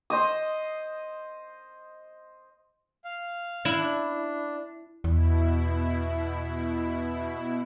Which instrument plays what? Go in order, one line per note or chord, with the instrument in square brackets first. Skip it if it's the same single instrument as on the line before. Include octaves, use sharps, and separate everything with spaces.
[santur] C5 D#5 D#6
[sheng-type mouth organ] F5
[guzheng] E4 [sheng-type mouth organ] F5 F#6
[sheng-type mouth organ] D4
[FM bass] E2 [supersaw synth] B2 E4